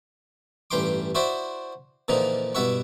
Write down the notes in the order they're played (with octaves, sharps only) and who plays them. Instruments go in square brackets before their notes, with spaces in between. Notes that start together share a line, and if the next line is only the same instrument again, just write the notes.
[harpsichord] A1 G2 E3 G5 C6 D6
E4 F#4 C5 D5 E5
A#2 D3 E3 F3 D#4
G2 B2 E4 E5 F#5 C#6